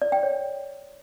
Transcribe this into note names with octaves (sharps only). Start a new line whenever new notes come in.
D5
G5
C#5